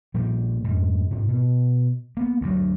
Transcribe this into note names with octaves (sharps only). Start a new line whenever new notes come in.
A#2 F3 G3
F2 G#2
G#2 C3
B2
A#3 B3
D2 G2 F#3